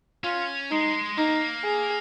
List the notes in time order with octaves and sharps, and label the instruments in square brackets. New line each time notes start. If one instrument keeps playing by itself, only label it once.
[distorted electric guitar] C#4 [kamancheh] F4
[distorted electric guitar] G#3 [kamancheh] D#4
[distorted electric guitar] A#3 [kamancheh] D#4
[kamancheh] G#4